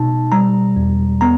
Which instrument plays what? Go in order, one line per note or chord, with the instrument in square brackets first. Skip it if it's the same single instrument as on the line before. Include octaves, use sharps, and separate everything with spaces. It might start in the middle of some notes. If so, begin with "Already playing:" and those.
Already playing: [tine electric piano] B2 D#4 A5
G3 A#5
E2
B3 A#5